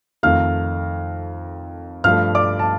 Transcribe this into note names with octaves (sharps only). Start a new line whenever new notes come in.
F2 D#3 A3 F5 F6
G2 F3 A3 F5 F6
D5 D6
A5